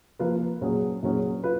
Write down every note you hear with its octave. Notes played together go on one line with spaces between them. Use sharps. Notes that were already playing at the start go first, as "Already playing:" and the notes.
F3 A#3 F4 B4
A#2 F#3 C#4 G#4
A#2 F#3 C#4 G#4
F4 B4